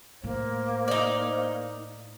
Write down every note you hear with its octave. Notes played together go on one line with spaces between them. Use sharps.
A2 A#3 C5
D#4 D5